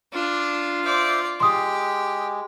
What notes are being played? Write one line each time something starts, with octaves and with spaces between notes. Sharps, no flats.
D4 F4
C5 D5 E5 D6
G#3 G4 C6 D#6